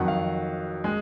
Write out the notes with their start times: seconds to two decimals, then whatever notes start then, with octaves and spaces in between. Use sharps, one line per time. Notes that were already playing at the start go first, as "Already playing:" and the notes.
Already playing: F2 D#3 F#3 F#5
0.08 F5
0.84 G#3